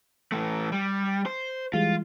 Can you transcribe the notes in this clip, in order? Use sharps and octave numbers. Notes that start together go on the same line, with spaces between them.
E3 A3
G3
C5
E3 G3 G#3 F4